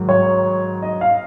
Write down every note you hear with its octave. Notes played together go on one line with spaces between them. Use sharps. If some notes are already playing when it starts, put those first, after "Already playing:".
Already playing: G#2 D#3 F#3
C#5
D#5
F5